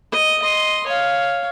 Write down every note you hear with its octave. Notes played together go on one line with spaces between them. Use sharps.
D#5
D#5 C6
C#5 F5